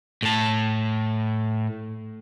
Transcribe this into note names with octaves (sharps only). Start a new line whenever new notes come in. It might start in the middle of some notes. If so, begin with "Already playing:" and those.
A2 A5